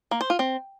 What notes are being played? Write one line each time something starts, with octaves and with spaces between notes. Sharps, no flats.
A#3
C5
F4
C4